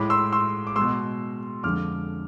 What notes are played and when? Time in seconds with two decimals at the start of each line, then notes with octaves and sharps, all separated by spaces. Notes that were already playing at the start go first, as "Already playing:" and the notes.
Already playing: A2 G#3 B5 D6
0.10 C6 E6
0.33 C6 E6
0.67 D6
0.76 G#3 C6 E6
0.81 B2
1.63 F2 D3 G#3 D6 F6